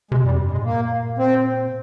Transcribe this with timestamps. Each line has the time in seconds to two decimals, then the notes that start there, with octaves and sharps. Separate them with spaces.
0.11 C3 G#3
0.25 F2 G3
0.39 G2
0.52 A#2 G#3
0.65 A#3
1.18 C4